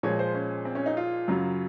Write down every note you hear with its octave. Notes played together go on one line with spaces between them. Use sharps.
A#2 F3 G#3 C#5
C5
C#4
C4
C#4
D#4
F4
F#2 C#3 F#3